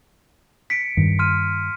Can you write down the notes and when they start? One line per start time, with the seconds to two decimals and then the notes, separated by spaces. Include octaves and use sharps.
0.70 B6 C#7 D7
0.97 G2 D#3
1.19 C6 F6 D#7